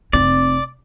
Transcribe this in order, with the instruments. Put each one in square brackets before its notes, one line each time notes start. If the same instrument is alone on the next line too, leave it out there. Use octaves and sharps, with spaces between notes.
[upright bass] F1 C4 [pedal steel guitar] D5